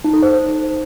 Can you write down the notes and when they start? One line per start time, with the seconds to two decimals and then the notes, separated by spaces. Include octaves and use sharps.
0.04 D#4
0.13 A4
0.22 C5